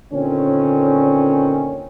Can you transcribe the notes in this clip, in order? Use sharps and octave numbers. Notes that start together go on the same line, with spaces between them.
A#2 D3 D#3 C4 C#4